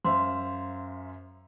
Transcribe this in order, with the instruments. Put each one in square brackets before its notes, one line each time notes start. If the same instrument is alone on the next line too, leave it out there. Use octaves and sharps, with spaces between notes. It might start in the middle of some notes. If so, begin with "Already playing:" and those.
[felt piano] F#2 [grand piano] C5 E5 F5 [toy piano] C6